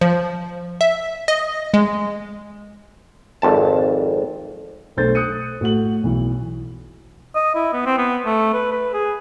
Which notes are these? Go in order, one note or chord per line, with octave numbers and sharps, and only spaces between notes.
F3
E5
D#5
G#3
G#1 F2 A5
B1 A3 D4 C5 G6 A6
D#6 F#6 C#7 D#7
A2 A3 F#4 F#7
B1 E3
D#5
E4
B3
C4
B3
A3
B4
B4
G#4